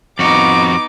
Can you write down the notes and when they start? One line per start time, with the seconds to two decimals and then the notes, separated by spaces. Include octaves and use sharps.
0.19 F2 B3 D#4 F#4 D6